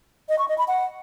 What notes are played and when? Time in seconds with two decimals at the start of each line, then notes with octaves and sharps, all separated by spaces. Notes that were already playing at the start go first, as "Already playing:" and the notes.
0.29 D#5
0.39 C#6
0.48 D#5
0.58 B5
0.68 F#5